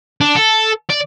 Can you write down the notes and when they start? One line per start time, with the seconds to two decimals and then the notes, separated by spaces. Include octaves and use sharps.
0.21 D4
0.36 A4
0.90 D5